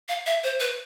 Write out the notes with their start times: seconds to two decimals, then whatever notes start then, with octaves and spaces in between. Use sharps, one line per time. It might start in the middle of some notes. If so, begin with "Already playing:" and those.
0.08 F5
0.26 E5
0.44 C5
0.60 B4